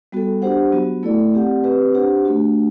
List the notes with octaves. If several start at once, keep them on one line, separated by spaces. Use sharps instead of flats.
G3 B3 F#4 A4
D4 G4 C5 F#5
F#3 B3 F#4
A3 E4 A4 D5
C4 G4 D5 F#5
C4 G4 B4
D4 G4 C5 F#5
A3 D4 F#4